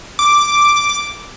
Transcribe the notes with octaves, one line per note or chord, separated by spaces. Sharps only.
D6